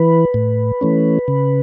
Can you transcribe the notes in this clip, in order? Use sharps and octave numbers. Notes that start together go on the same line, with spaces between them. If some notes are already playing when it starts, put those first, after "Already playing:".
Already playing: E3 B4
A2
E3 A3 C#4
C#3